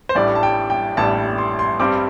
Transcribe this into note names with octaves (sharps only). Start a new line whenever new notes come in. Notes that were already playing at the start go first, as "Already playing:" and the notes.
C5
A1 A2 G3 D4 D5
A5
G5
G5
A1 A2 G3 D4 A5
C6
C6
G2 G3 C4 D6